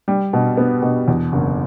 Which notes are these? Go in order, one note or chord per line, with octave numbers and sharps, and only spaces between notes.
G3
B2
B3
B2
E2
F#1